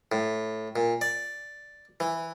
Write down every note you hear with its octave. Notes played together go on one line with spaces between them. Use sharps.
A2
A#2
D5
E3